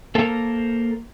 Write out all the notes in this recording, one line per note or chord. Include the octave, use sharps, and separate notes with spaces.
A#3 A4 A#4 C5